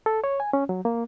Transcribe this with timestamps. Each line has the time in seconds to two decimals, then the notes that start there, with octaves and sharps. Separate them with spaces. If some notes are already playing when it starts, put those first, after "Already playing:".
0.06 A4
0.24 C#5
0.40 G#5
0.53 C#4
0.69 F#3
0.85 A#3